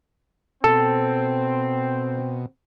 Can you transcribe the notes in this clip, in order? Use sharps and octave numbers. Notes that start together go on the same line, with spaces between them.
B2 C4 A4